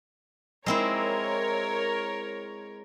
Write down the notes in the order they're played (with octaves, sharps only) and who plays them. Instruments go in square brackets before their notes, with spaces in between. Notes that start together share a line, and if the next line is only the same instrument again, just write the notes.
[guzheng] G#3 C4 E4 [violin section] A#4 C#5